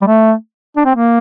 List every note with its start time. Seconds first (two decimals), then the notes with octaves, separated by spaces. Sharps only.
0.01 G3
0.07 A3
0.76 D4
0.85 C4
0.95 A#3